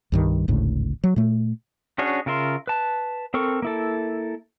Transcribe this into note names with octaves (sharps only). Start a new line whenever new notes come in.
C2 G2 D#3
G#1 D2 A2 C#3
F#3
A#2 A3
C#4 D4 F#4 G#4 C#5
C#3 F4 A#4 E5 C6
B4 A5
C4 A4 A#4 C#6
A#3 E4 A4